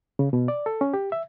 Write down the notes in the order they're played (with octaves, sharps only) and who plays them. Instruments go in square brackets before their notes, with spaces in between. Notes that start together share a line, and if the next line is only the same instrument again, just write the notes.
[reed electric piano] C#3
B2
D5
A4
C#4
G4
E5